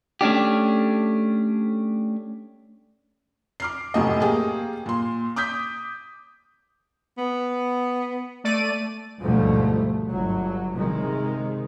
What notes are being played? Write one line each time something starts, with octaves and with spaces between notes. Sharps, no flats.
A3 C#4 D4 G4
D6 F6 C7
F1 F#2 A2 A3 G4 D#5
A#3 G4 G#4
A#2 C6
D6 D#6 G6 B6
B3
A3 D5 D#7
D2 G#2 B2 F3 G3 A3
G1 F#3
C3 D#3 G#3